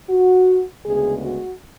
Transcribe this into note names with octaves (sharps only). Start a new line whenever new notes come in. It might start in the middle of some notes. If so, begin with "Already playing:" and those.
F#4
D2 C#3 G#3 B3 G#4
F#4